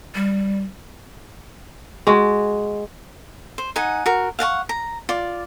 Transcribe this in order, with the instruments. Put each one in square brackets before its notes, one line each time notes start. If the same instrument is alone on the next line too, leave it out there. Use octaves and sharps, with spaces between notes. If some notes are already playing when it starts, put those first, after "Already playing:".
[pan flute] G3
[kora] G#3 F#4
[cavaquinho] C5
D#4 F#5 G#5
F#4 A#4
F5 F#5 A5 C#6
A#5
F4 D5